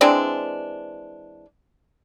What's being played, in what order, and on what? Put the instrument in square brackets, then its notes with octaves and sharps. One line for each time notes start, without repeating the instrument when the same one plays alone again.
[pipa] E3 G#3 C4 D4